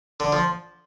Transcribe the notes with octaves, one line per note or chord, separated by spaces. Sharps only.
D3
F3